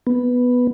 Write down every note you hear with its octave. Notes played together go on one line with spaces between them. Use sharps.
B3